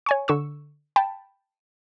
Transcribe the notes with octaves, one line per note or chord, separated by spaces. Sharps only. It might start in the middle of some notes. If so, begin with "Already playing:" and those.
C#5 G#5 C#6
D3 C#6 E6
G5 A5 B5